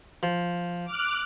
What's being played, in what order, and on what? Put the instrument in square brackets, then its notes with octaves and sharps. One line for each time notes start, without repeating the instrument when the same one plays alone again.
[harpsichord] F3
[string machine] D6 F6 F#6